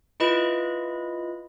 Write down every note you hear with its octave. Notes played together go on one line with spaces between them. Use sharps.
E4 F4 B4 D#5 B5